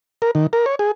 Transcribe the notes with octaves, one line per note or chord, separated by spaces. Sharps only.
A#4
D#3
A#4
C#5
G#4